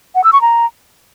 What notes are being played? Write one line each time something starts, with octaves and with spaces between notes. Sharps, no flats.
F#5
E6
C#6
A#5